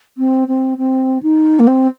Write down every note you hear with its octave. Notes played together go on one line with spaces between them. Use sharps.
C4
C4
C4
D#4
A#3
C4